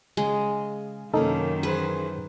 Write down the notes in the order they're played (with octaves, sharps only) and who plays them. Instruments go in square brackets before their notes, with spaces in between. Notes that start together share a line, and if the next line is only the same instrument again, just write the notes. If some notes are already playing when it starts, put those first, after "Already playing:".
[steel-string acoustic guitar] C#3 [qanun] G#3
[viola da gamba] F#2 D#3 [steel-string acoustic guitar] C3 A#3 C#4 [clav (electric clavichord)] D#4 A4
[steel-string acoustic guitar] E3 G#4 C5 [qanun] B4